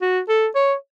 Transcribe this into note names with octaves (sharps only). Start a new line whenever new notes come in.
F#4
A4
C#5